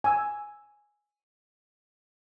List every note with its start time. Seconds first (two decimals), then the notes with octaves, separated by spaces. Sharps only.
0.04 G#5 E6